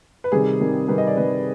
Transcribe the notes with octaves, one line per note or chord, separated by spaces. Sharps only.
B4
C3 D#3 G3 G#4
C3 D#3 G3
C3 D#3 G3 B4
D#5
D5
C3 D#3 G3 B4